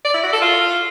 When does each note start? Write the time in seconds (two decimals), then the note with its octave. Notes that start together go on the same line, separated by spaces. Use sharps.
0.05 D5
0.14 E4
0.23 F#4
0.33 A4
0.42 F4